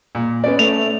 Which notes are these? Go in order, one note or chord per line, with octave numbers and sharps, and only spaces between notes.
A#2
B3 C#4 D5
A3 F7